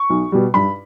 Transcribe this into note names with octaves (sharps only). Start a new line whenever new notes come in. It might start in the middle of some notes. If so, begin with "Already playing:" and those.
Already playing: C#6
B1
B2 G3
G2 B5